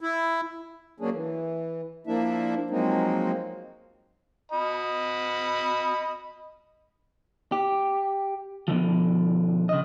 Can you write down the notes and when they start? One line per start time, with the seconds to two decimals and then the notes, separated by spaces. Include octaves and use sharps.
0.01 E4
1.00 F#3 A#3 C#4 D4 G#4
1.14 E3
2.07 F3 A#3 D4 E4 E5
2.70 F3 F#3 G#3 A#3 C4 D#4
4.52 D#5 B5
7.52 G4
8.68 B2 D3 E3 F3
9.69 C#3 D#5